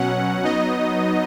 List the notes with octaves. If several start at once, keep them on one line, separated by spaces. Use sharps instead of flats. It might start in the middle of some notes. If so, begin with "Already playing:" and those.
Already playing: B2 F#3 C#4 F#5
F#3 B3 D#4 D#5